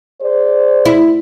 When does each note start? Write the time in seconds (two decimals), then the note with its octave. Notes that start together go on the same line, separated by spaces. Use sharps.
0.21 G#4 C5 D5
0.85 E4